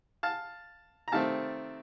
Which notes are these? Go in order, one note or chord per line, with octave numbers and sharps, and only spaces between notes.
F5 A5
A#5
C3 D#3 A3 C4 F5 A5